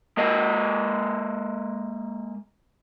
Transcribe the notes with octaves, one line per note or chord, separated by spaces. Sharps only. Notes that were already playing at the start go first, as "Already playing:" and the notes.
G#3 A#3 A#4 D#5